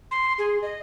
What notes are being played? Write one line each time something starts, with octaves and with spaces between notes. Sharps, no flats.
C6
G#4
D#5